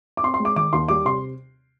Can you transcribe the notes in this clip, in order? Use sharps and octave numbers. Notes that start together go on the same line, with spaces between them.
D6
C4 C6
C6
G#3
D6
D#3 D6
D#2 C6
G3 D6
C3 C6